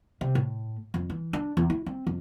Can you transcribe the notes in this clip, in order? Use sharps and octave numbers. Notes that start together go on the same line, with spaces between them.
C3
A2
F2
E3
D4
E2
E4
C4
F2